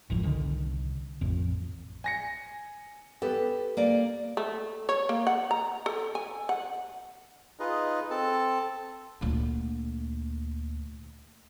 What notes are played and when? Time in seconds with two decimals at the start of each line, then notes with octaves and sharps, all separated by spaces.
0.10 D#1 G#1 F2 A2
0.23 C2 D3 D#3
1.21 A1 F2
2.04 G#5 A#6 C#7
3.22 B3 G4 A4
3.77 A#3 D5
4.37 A3
4.89 C#5
5.09 A#3
5.27 F#5
5.51 A#5
5.86 A4
6.15 G#5
6.49 F#5
7.60 D#4 F4 G#4 B4 D#5
8.11 C4 A4 A5
9.21 D2 A#2